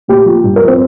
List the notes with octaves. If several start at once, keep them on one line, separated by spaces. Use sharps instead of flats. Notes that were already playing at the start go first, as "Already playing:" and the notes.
A#2 G4
F3
G2
A#4
F3
C4